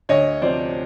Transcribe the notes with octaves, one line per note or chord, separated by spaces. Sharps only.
D2 C#5 D#5
C3 F3 C5 D5